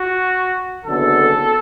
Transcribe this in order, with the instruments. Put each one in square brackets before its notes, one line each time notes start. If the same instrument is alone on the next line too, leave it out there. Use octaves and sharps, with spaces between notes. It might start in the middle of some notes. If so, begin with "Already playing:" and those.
Already playing: [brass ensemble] F#4
F#1 F#2 D3 B3 A4